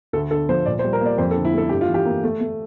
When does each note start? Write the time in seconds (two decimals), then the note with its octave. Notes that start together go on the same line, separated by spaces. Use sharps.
0.13 D2 A4
0.31 D3 A4
0.49 F3 C5
0.66 A#2 D5
0.79 C5
0.84 G3
0.93 A#4
1.01 A#3 D5
1.18 F2 C5
1.31 A4
1.36 D3
1.45 E4
1.53 A3 A4
1.69 G2 G4
1.81 F4
1.89 E3
1.94 G4
2.05 A#3
2.24 A3
2.41 A3